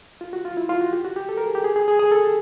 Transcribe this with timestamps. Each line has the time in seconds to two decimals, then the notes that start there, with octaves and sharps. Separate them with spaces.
0.21 F4
0.33 F#4
0.45 F4
0.57 E4
0.69 F4
0.81 F#4
0.93 G4
1.05 F#4
1.16 G4
1.29 A4
1.37 A#4
1.46 G#4
1.55 G4
1.64 G#4
1.76 G#4
1.88 G#4
1.99 G#4
2.12 A4
2.23 G4